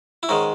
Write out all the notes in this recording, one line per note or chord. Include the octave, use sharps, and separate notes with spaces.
E4
G#2 D#3 G#3 C#4 D#4